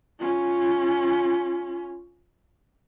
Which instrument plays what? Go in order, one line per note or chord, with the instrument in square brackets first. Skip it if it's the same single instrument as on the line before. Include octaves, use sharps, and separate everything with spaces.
[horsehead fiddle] C#4 F4